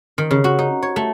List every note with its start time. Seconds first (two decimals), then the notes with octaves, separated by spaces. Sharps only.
0.18 D#3
0.31 C#3
0.44 F#4
0.59 D#4
0.83 C#5
0.96 A3